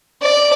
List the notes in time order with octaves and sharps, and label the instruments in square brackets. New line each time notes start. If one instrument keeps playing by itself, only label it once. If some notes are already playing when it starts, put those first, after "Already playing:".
[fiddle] D5